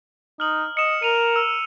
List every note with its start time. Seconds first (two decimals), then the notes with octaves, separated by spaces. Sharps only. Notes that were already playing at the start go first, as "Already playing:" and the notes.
0.40 D#4 F6 F#7
0.77 D#5 C#7 E7
1.02 A#4 D#7 F7
1.36 E6